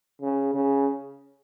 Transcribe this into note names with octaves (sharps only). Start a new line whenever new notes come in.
C#3
C#3